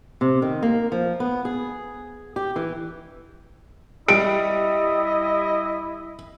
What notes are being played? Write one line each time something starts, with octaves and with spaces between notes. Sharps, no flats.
C3
D#3
A#3
F3
B3
G#4
G4
E3
G3 E4 D#5 D7